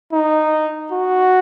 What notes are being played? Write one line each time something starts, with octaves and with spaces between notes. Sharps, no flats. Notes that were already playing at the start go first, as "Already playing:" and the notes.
D#4
F#4